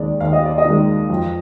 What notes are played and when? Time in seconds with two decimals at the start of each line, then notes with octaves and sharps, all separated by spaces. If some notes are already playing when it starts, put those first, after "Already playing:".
Already playing: D#2 D#3 G#3 D5
0.20 D#2 F5
0.33 D#5
0.45 D5
0.58 D#5
0.65 D#3 G#3
1.10 F2